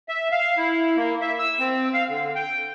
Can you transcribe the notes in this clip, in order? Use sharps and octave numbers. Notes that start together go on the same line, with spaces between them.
E5
F5
E4
A#3
E5
E6
C4
F5
D3
G5